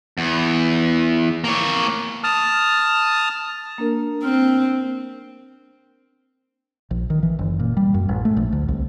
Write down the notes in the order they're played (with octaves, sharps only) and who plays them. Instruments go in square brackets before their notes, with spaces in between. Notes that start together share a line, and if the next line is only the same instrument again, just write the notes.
[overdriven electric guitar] E2
A#3 C#5
[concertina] A5 D#6 F6
[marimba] A#3 D4 A#4
[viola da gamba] C4 [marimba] F6
[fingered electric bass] A#1
D#3
E3
F#1
A#2
G3
F#2
A1
A3
A#1
D2
C2